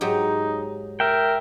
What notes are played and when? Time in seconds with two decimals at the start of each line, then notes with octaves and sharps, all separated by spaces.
0.01 G#2 F#3 D#4 G4
1.00 A#4 E5 G5